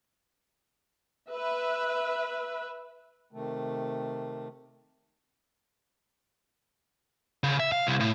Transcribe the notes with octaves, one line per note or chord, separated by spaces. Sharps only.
B4 E5
C3 D#3 A3
C#3
E5
F5
C2
A2